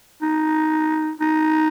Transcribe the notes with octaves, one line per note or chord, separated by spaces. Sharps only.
D#4
D#4